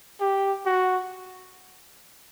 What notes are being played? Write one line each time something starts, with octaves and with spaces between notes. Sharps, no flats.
G4
F#4